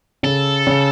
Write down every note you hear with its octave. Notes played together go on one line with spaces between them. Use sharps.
C#3 A4
C#3